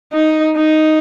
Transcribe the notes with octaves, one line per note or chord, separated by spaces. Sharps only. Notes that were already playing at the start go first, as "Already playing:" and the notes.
D#4
D#4